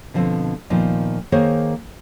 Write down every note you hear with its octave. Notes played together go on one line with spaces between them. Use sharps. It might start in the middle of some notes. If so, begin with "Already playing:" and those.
B2 D3 F3 C4
A#2 D#3 F3 B3 D#4
D#3 A#3 G#4 C5 C#5